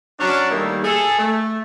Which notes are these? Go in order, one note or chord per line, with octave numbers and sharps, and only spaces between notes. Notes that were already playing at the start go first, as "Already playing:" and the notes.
F#3 C#4 D4
D#3 G3 A3 A#3 D#4 E4
G#4 A4
A3